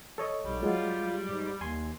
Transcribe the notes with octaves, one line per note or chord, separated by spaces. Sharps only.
A4 C#5 D#5
B1 G3
F#3 G#3 F4
G#2
D#2 G#5 C6